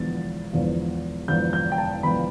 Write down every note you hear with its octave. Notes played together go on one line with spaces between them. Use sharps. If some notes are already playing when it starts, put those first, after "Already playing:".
Already playing: E1 E2 D3 F3 B3 A6
E1 E2 D3 F3 B3
E1 E2 D3 F3 B3 G6
G6
G5
A5
E1 E2 D3 F3 B3 B5